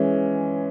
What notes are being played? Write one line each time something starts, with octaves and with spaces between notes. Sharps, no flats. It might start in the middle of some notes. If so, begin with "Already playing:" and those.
Already playing: E3 G#3 C#4